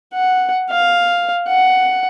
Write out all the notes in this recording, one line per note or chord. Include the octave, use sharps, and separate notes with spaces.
F#5
F5
F#5